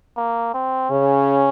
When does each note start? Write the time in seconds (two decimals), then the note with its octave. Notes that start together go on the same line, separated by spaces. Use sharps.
0.17 A#3
0.54 C4
0.91 C#3 C#4